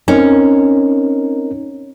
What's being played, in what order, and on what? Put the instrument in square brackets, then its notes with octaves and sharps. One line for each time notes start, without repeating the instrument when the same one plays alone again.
[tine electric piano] C4 D#4 A#4 [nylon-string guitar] C#4